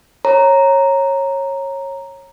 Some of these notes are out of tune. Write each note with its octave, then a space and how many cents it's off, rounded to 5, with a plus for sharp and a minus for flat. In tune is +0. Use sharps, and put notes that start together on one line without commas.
C#5 -20 A#5 +0